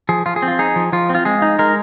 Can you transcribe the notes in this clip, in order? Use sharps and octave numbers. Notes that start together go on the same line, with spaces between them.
F3 G#4
F3 F4
G#4
C4
F4
D#4 G#4
F3
F3 F4
C4
F4
G#3 G#4
D#4
G#3 A#4